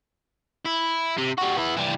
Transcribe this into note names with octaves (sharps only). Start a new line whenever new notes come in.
E4
C3
G3 F#4
B3 E4
E3 G3